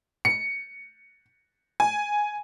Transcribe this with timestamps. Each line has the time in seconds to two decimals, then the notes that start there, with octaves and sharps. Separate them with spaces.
0.25 C#7
1.80 G#5